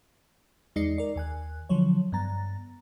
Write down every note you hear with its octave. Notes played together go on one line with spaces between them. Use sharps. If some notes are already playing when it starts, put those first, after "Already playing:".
E2 G#3 D#4 D5 C7 C#7
A#4 D5
D#2 G#5 F#6
D3 F3 F#3 C#5
G2 B3 A#5 A6